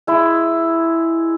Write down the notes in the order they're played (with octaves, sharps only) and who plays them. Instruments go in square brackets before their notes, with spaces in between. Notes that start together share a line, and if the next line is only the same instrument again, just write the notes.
[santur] G#3 E4